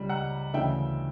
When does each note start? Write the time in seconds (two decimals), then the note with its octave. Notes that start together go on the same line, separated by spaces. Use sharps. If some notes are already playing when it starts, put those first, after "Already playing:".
Already playing: C#2 C#3 G3
0.09 F#5 A#5
0.54 D2 C#3 E3 E5 G5